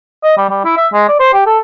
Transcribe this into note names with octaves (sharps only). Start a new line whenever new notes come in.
D#5
G3
G3
E4
E5
G#3
D5
C5
G4
A4